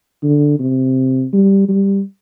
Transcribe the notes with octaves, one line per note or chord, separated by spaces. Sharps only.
D3
C3
G3
G3